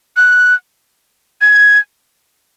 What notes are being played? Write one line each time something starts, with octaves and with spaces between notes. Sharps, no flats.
F#6
G#6